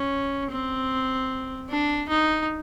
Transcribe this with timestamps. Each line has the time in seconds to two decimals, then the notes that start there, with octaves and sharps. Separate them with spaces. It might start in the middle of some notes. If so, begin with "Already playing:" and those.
Already playing: C#4
0.51 C4
1.69 D4
2.08 D#4